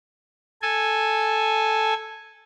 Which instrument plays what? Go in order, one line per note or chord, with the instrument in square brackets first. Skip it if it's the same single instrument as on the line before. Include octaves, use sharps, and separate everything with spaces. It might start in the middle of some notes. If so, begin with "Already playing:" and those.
[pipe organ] A4 G#5